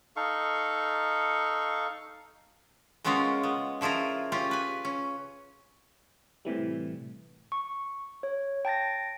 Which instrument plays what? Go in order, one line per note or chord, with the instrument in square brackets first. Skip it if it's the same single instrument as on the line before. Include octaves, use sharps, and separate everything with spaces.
[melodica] D#4 A4 F5 C#6
[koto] C#3 G#3 B3 C#4 F4 A#4
B3
C#3 F3 E4 F4 A#4
C#4 F4 G4
B4 G#5
C#4
[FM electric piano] A2 C3 E3 G3
[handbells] C#6
C#5
G5 A5 A6 A#6